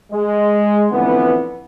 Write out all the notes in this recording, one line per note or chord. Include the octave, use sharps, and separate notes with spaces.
G#3
F2 A2 D3 E3 B3